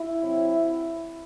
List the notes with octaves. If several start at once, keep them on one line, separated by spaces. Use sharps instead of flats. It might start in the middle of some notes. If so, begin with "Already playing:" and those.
Already playing: E4
C3 F#3 C4